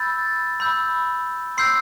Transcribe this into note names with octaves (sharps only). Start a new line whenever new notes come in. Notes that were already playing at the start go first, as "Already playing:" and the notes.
Already playing: B5 E6 G6 A6
B5 E6 G6
C6 E6 G6 C7